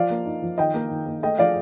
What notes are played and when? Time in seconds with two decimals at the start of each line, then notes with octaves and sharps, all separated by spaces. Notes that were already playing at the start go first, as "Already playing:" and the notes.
Already playing: F3 D5 F5
0.10 A#3
0.25 D#4
0.42 F3
0.58 D#3 D#5 G5
0.74 A#3
0.91 D#3
1.06 A#3
1.23 A3 D#5 G5
1.38 F3 D5 F5